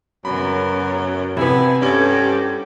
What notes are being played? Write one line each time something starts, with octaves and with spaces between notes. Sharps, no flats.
F#2 C#3 B3 A#4 B5
C3 B3 E4 G#5 A5 B5
G2 C#4 G4 A4 C5 G#6